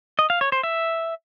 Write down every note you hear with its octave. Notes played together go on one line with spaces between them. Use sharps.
D#5
F5
C#5
C5
E5